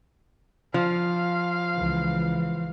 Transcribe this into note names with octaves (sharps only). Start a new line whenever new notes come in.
F3 F5
C#2 E3